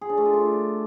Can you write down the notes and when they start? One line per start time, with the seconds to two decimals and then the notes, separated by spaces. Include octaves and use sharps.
0.01 G#4
0.09 D4
0.17 A3
0.25 F4
0.33 D4